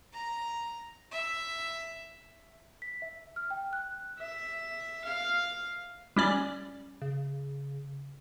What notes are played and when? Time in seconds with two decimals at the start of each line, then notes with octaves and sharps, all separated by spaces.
0.13 A#5
1.12 E5
2.82 B6
3.02 E5
3.36 F6
3.50 G5
3.73 F#6
4.19 E5
5.05 F5
6.16 G3 C#4 D5
7.01 C#3